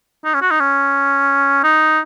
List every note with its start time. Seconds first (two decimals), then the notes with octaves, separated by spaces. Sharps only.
0.25 D#4
0.34 C#4
0.42 F#4
0.51 D#4
0.60 C#4
1.63 D#4